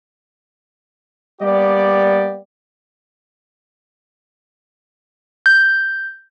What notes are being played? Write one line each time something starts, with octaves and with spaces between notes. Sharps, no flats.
G3 A#3 B3 G4 D5
G6